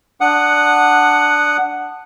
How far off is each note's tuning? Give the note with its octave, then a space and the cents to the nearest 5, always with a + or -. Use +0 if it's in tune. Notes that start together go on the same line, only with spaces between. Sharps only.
D4 +0 F#5 +0 D#6 -20